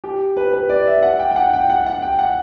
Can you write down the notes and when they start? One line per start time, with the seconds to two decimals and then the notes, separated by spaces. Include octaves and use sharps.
0.04 G4
0.37 B4
0.53 B4
0.69 D5
0.87 E5
1.03 F#5
1.19 G5
1.31 G5
1.36 F#5
1.53 G5
1.70 F#5
1.86 F#5
2.02 G5
2.19 F#5